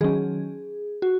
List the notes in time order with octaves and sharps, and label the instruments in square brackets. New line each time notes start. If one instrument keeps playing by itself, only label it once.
[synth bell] D#3 F#3 C#4 G#4
F#4